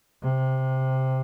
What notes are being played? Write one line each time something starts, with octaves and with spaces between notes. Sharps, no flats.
C3